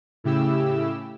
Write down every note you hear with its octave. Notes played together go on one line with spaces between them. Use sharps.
A2 C#3 E4 G4 E6